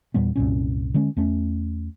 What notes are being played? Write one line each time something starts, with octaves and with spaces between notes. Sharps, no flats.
E2 A#2 G3 B3
C2 F#2 A#2 C#4
D3 G#3 C#4
E2 A3 C#4